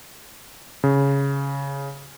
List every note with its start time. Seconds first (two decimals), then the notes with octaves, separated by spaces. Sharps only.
0.84 C#3